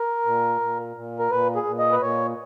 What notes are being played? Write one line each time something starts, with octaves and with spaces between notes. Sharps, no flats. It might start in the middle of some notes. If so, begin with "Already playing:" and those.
Already playing: A#4
A#2
A#2
A#2
A#4
A#2 B4
G#4
A#2
D#5
B4
A#2 C#5